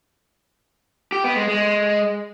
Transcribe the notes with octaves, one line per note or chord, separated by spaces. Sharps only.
G4
B3
G#3
G#3